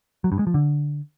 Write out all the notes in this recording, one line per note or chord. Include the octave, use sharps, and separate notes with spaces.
F#3
G2
G#3
F3
D3